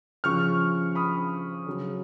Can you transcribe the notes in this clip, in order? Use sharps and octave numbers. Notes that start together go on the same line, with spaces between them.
C#3 F3 C#6 F6
B5 D#6
C#3 F#3